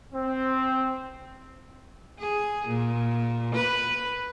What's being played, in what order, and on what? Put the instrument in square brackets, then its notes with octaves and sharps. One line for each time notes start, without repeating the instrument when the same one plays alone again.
[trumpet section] C4
[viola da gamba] G#4
A#2
B4